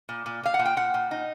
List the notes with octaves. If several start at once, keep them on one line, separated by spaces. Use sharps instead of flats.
A#2
A#2
A#2 F5
F#5
A#2
G5
A#2 F#5
A#2
D#4